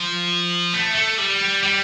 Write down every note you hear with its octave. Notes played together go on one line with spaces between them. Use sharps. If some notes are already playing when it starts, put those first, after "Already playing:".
Already playing: F3
A3
A3
G3
G3